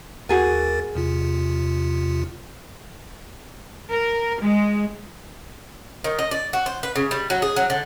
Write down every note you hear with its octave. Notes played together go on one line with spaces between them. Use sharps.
D#2 F#4 G#4 A#4 G#5 A6
E2 C3 F4
A#4
G#3
D#3
D#5
D5
F#4
C5
B4
C#3
G3
F#3
G#4
F#3
D3